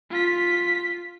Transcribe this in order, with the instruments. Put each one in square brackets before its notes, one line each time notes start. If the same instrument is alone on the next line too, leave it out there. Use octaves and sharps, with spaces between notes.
[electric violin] F4 B6